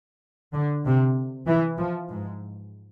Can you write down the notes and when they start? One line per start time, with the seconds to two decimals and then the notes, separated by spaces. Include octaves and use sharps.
0.54 D3
0.85 C3
1.48 E3
1.78 F3
2.09 G#2